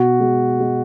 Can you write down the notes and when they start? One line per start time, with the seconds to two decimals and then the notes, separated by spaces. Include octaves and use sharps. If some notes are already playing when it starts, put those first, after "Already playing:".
Already playing: B2 F#4
0.20 G#3
0.60 G#3